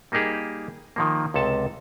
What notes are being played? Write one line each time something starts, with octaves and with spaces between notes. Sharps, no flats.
G3 A#3 D#4 G4 G#4
D#3 F3 A#3
C#2 C3 A4 A5